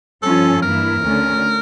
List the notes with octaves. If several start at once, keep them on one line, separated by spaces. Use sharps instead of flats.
G2 F3 C#4 F4 A4
G2 E3 A#3 E4 A#4
D2 D3 A3 C#4